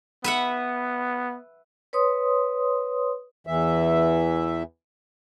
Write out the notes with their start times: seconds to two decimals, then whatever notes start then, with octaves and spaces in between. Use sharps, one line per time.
0.24 B3 B4 E5 F#5
1.93 B4 C#5 C6 D#6
3.47 E2 E3 E5